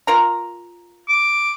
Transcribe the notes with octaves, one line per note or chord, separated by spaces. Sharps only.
F4 A#4 A#5
D6